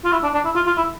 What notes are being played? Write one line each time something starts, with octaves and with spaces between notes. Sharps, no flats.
F4
E4
D4
D4
E4
F4
F4
E4